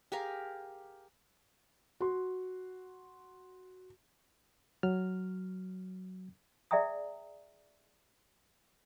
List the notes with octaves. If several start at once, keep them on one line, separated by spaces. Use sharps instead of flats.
G4 G#4 A#4 F5
F#4 C6
F#3 F6
G#4 D5 E5 G5 A#5 D#6